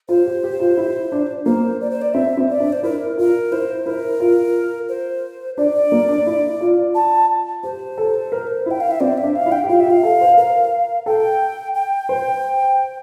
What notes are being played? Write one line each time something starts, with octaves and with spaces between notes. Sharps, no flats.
F4 C5
G4
G4
F4
E4
D4
A#3 C5
D5
C5
D5
C4 E5
C4
D5
D4
C5
E4 A#4
F4 A#4
E4 C5
E4 A#4
F4
C5
D4 D5
A#3
D4
E4
F4
A5
G4 C5
A4
A#4
E4 G5
F5
E5
C4 D5
E5
D4
F5
E4
G5
G4
F4 F5
E5
F4
F5
A4
C5
A#4 F5
A4 G5
G5
C5